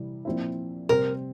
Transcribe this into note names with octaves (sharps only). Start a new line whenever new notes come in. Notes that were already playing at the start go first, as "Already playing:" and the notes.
Already playing: C3 E3 G3
A#2 F3 C4 E4
C3 G3 C4 A#4